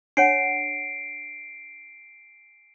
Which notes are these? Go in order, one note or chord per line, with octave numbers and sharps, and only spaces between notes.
D4 C#5 F#5 C7 D7